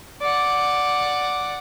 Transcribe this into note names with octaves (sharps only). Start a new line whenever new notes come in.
D5 F#5